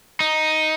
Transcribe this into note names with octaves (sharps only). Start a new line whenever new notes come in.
D#4